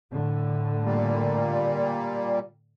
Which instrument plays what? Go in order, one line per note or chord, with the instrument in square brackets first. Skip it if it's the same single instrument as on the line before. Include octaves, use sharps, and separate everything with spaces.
[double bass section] A2 D3 A3
[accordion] A#2 G3 A#3